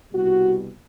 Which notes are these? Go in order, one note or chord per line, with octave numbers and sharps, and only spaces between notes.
C2 B2 G3 F#4